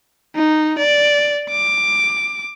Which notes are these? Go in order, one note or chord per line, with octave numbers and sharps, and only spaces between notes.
D#4
D5
D6